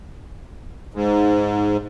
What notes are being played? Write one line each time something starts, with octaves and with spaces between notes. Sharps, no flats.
G#2